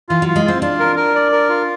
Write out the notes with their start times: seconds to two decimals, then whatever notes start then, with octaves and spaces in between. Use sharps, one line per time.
0.09 E3 F4
0.22 F#3
0.28 F4
0.36 G#3
0.45 C4 F4
0.62 D4 F4
0.80 A#4
0.96 A#4
1.15 D5
1.32 A#4
1.49 F4